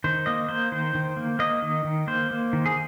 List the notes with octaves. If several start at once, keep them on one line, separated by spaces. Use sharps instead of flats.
D#3 C5
A#3 D#5
A#3 C5
D#3 C5
D#3
A#3
A#3 D#5
D#3
D#3
A#3 C5
A#3
D#3
G#4